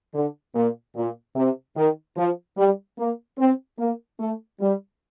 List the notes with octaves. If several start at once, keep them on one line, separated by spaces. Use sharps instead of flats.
D3
A#2
A#2
C3
D#3
F3
G3
A#3
C4
A#3
A3
G3